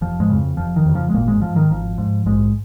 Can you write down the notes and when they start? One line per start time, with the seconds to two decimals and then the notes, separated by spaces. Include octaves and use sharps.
0.01 F1 F3
0.20 G#2 G#3
0.29 F2 C#3
0.57 F1 F3
0.76 D#3
0.86 F2 C#3
0.95 F3
1.10 G#3
1.14 G#1 A#2 A#3
1.28 G#2 G#3
1.42 G#2 F3
1.56 D#3
1.70 G#1 F3
1.98 G#2
2.26 A#1 G#2 G#3